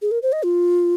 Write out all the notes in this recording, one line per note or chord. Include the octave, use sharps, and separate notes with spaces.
G#4
A#4
C5
D#5
F4